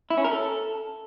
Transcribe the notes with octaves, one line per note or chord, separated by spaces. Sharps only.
E4
C#4
A#4
A4